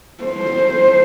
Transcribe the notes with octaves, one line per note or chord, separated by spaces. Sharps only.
C5